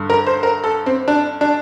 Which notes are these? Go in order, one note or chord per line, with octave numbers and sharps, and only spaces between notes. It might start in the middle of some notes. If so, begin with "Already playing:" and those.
Already playing: G2 D3
A#4
C5
A#4
A4
C4
D4
D4